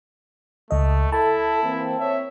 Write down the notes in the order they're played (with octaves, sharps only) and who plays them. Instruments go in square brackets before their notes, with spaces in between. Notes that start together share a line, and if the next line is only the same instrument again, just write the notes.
[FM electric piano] C#2 D#5 [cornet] A3
[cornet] E4 [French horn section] A4 [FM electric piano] A5
[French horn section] E3 A#3 C4
[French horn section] C4 C#5 [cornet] E5